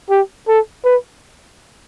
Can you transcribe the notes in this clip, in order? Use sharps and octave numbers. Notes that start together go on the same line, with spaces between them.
G4
A4
B4